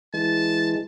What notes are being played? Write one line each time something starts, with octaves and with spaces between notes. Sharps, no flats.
E3 G#3 A5